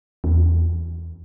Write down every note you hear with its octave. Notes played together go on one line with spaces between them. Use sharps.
E2